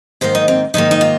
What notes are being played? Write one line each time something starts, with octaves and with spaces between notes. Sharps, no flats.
G#2 D#3 A#3 C5
D#4
C4
G#2 D#3 A#3 D#4
D#4
F4